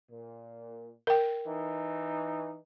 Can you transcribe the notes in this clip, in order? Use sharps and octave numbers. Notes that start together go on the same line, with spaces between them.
A#2
A#4 G5
E3 D#4